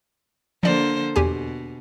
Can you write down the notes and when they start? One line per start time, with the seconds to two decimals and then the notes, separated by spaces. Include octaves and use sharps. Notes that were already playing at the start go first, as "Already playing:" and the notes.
0.63 D3 F3 A#3 C5 D5
1.16 E2 B2 G4 G#5